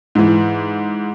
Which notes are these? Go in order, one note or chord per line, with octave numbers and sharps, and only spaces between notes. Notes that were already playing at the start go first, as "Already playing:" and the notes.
G#2 E3